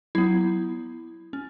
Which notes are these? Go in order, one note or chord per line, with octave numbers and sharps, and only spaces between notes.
F#3 B3 E4
C#4